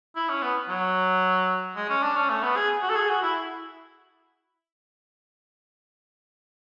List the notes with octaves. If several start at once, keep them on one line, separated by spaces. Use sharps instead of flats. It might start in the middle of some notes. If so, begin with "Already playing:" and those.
E4
C#4
B3
F#3
G#3
C#4
D4
C#4
A3
B3
G#4
F#4
A4
G#4
F#4
E4